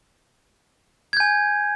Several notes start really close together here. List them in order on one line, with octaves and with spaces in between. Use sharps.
G#6 G6 G#5